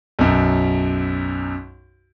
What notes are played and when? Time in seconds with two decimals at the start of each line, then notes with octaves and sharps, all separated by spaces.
0.19 B1 F#2